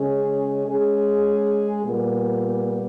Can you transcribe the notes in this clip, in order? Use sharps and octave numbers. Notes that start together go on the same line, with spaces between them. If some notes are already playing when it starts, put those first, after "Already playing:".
Already playing: C#3 G#3 C#4 G#4
G#3 C#4 G#4
A#2 G3 B3